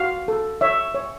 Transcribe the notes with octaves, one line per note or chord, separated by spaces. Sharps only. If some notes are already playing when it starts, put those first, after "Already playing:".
Already playing: F#4 F5
A4
C#5 E5
C#5